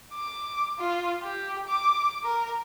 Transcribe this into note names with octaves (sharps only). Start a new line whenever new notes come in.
D6
F4
G4
D6
A#4